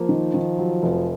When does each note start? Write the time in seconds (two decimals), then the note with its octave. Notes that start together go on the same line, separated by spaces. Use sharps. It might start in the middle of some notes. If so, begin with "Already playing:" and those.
Already playing: F3 A#3
0.09 D#3
0.34 D#3
0.58 F#3
0.83 F1